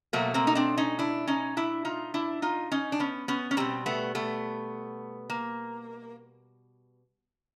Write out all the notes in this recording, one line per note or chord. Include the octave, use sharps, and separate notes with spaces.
B2 F#3 A3 A#3
A#3 C4
D#4
C4 D4
C#4 D#4
D4 E4
C#4 D#4
D4 E4
D#4 F4
D4 E4
D#4 F4
C#4 D#4
D4
B3 C#4
B3 C#4
C#4
B2 G3 A#3 C4
A3 B3
A3 B3
A#3